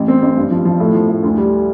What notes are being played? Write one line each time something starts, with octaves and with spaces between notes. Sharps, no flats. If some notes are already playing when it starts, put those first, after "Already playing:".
Already playing: A1
C4
A1
G2
F3
F3
A2
F3
A2
D2
G3